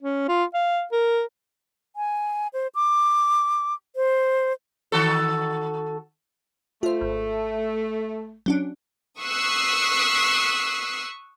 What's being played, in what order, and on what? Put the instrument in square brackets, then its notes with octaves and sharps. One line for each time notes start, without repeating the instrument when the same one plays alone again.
[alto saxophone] C#4
F4
F5
A#4
[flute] G#5
C5
D6
C5
[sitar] D#3 F#4 A4
[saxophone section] A3 [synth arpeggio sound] F4 C5
[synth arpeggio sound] G#1
F#3 C#4 D4
[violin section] C#6 D#6 E6 F#6 B6 C7